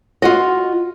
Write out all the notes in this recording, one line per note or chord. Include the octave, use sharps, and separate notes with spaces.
F4 F#4 D#5